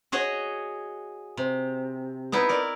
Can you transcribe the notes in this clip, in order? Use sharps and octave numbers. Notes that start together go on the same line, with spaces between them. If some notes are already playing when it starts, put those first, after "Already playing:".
F#4 G#4 C#5 D#5 F#5
C3
B3 D#4 E4 B4
A#4 D5